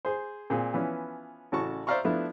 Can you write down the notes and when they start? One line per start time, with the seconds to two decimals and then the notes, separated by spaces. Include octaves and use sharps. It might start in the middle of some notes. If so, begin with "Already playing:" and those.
0.05 G#4 C5
0.50 A#2 C4 G#4
0.74 E3 F3 B3 C#4
1.52 A1 C#3 C#4 F#4 A5 C#6
1.87 C5 D5 E5 F5 A#5 C#6
2.04 F3 A3 B3 D4 E4